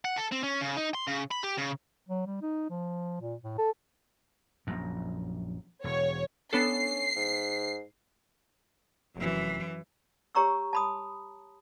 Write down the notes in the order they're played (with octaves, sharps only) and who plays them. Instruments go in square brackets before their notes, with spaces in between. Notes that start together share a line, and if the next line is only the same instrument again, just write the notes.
[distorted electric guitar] F#5
A4
C4
C#4
C#3
D#4
C6
C#3
B5
G4
C#3
[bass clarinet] F#3
G3
D#4
F3
A#2
A2
A4
[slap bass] A#1 F#2
[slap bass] E1 [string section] C#5
[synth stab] B3 D4 A4 [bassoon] C#4 [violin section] C7
[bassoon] G#2
[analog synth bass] F1 [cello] F#2 E3
[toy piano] G4 C#5 A#5 C#6 E6
A5 B5 D#6